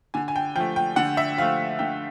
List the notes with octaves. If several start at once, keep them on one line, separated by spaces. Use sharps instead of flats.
D3 G#5
G#5
G5
F3 G5
A3
G5
D3 F#5
E5
F3 A3 F5
D3 G5